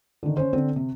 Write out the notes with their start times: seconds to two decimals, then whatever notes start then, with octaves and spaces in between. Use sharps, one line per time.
0.23 D3 D#3
0.37 C#4 C5
0.53 D3 C4
0.76 C3